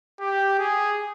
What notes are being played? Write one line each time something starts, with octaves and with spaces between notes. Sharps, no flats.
G4
G#4